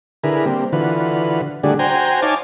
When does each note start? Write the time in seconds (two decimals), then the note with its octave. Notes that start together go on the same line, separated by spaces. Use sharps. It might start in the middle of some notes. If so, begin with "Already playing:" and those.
0.24 D3 E4 G#4 A#4 B4
0.46 G3 A#3 C4
0.73 D3 E3 F4 F#4 B4
1.63 D3 G3 A3 D4 F#4 G#4
1.79 F#4 C5 G5 G#5 A#5
2.22 D#4 C#5 F5 G#5 A5 D6